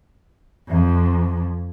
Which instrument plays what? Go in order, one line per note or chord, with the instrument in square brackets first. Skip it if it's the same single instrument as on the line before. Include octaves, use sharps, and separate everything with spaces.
[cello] F2